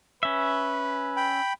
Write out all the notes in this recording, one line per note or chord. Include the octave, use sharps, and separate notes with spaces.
C#4 B4 E5
G5 B5